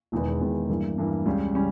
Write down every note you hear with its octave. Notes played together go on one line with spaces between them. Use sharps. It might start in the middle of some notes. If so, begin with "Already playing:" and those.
E1 E2 D#3 G#3 B3
E1 E2 D#3 G#3 B3
G2 E3 A#3
G2 E3 A#3
C#2 C#3 G3 C#4
C#3 G3 C#4